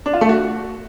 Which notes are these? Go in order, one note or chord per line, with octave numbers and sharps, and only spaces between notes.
D4
F4
A3
F#4